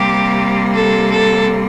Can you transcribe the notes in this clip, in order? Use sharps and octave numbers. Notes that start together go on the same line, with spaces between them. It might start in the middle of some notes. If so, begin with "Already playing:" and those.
Already playing: C3 G3 A#3 G4
A4
A4